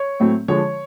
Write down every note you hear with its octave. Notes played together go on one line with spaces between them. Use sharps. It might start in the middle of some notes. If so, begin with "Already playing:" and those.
Already playing: C#5
A2 F#3 A3 C4
D3 F3 G#3 C#5